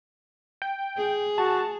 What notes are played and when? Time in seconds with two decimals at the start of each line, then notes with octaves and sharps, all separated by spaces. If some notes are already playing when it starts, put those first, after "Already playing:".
0.62 G5
0.97 G#4
1.38 F#4 A5